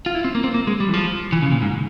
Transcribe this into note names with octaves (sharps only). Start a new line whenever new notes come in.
F4
E4
C4
A#3
C4
A#3
G#3
G3
E3
F3
E3
C#3
A#2
G#2